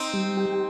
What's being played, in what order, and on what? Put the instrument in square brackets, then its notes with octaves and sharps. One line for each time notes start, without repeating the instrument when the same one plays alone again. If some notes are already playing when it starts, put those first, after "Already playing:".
Already playing: [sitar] C4 D#4
[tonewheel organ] G3
G4